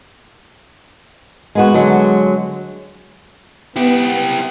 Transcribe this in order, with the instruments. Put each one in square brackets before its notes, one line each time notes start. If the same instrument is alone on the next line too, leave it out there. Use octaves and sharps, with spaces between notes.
[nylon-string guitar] G#3 B3 F#4
D3 F#3 G#3
[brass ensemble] B3 [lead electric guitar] E4 G4